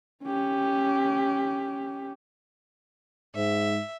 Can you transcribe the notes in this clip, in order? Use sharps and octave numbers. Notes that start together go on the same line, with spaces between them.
C#4 G4
G#2 E5